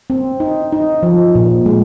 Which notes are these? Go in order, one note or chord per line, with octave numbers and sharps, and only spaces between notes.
C4
D#4
D#4
F3
A#2
G#3